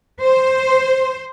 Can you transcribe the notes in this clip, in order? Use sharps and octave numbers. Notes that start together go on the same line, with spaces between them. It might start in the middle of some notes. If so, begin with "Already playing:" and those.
C5